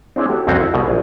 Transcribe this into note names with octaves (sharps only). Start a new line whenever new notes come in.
C4 D4 E4 G#4 C#5
F#4 G4 A4
C2 F2 C4 C#4 F#4
E4
C2 B2
A#1 G#5